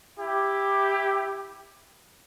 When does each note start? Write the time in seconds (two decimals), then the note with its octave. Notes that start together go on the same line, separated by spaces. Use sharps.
0.20 E4 G4